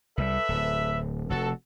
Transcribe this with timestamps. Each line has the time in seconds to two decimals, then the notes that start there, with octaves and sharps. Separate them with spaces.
0.17 C2 G3 A4 B4 E5
0.49 D1
1.30 F1 F#4 A4